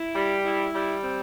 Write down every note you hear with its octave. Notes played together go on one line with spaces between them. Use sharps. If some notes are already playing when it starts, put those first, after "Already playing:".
Already playing: E4
G3
E4
G3
C4